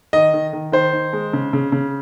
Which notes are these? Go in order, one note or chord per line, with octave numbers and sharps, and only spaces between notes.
D#3 D#5
D#3
D#3
D#3 C5
D#3
G#3
C#3
C#3
C#3